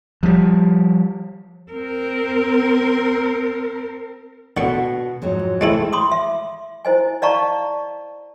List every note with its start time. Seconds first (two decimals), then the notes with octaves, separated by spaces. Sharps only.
0.23 F3 G3
1.72 C4 A#4
4.57 B2 D3 F#5 C#6
5.22 F2 G#2 F#3
5.61 G#3 A3 C4 E4
5.93 B5 C6 D6 D#6
6.12 E5
6.85 E4 C5 D#5 G#5
7.22 D5 D#5 F5 A5 A#5 C#6